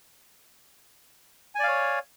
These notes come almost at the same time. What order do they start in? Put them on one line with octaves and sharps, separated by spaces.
G#5 D5 F5 C#5